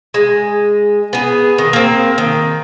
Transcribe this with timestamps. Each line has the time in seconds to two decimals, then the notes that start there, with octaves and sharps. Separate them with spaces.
0.14 G#3
1.13 B3 G#4
1.58 D#3
1.73 A#3 C4
2.18 D#3